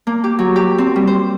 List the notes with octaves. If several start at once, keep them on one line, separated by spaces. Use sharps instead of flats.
A#3
G4
F#3
G4
C4
G3
C5